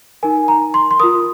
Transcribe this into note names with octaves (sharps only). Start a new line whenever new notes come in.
D#4 A#4 G#5
A#5
C6
C6
F4 A#4 D#6